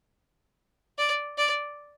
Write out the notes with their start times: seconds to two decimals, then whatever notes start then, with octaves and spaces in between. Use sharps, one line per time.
0.99 D5
1.38 D5